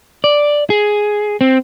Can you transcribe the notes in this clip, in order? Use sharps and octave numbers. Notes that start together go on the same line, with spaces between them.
D5
G#4
C4